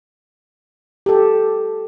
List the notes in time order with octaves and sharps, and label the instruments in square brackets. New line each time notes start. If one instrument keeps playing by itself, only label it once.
[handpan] G4 A4